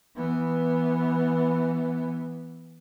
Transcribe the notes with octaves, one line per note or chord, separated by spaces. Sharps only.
E3 B3